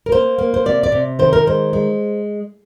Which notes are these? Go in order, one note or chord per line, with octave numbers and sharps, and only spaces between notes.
A#4
A#3 C5
A#3
C5
C3 D5
D5
C3
D#3 C5
A#4
G#3 C5
G#3